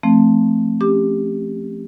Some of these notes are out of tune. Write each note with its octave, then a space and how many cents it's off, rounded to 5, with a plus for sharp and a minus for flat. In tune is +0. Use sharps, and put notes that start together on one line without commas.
F3 -25 A3 +0 C4 +0
C#4 -15 G4 +10 D6 +20